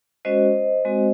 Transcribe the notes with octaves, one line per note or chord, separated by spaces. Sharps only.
G#3 C#4 F#4 C5 D#5
G#3 C4 F#4